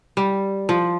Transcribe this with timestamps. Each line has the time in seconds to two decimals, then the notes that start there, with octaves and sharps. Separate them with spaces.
0.17 G3
0.69 F3